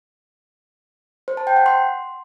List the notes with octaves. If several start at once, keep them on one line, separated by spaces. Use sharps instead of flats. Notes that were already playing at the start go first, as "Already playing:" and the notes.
C5
A5
G5
F#5
C6